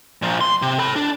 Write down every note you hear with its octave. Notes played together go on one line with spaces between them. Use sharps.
A#2 F3
C6
C3
A4 B5
D4